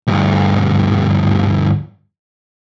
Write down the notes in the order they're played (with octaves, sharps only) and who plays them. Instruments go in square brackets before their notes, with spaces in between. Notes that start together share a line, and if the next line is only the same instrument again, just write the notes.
[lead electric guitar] D2 G2